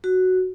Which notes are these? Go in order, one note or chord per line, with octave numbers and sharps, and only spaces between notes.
F#4